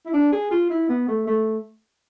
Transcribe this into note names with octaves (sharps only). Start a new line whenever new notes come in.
E4
D4
G#4
F4
E4
B3
A3
A3